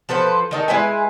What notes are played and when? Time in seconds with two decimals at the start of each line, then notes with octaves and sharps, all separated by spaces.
0.09 F3 A4 B4 C5
0.51 D#3 D#4 A4
0.68 G#3 E4 B4 G#5